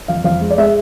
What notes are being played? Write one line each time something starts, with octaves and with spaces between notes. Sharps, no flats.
F2 F5
F2 F5
G#3
D5
G#3 E5